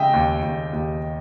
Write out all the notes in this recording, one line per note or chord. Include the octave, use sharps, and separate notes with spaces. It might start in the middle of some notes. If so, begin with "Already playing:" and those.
Already playing: C#3 G#3 D#5 E5 G5
D#2
D#2
D#2